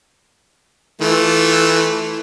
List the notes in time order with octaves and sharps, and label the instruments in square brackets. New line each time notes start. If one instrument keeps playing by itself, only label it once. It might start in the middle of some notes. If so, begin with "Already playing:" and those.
[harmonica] E3 A3 F4